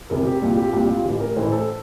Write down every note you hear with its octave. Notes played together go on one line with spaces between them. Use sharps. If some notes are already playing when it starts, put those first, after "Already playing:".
E1 E2 C3 A#4
G4
C2 A#2 G3
G4
F4
C2 A#2 G3 G4
F4
A1 A2 E3 G4
A#4
A1 A2 E3 C5
A4